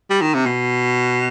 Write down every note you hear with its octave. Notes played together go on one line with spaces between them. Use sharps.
G3
D#3
C3
B2